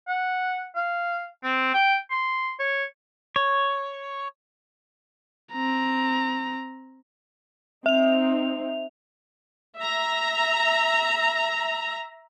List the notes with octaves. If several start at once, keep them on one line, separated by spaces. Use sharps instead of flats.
F#5
F5
C4
G5
C6
C#5
C#5
C4 A#5
C4 D#4 E5 F7
E5 A#5